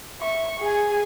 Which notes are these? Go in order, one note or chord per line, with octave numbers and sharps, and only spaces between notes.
E5 C#6
G#4 G#5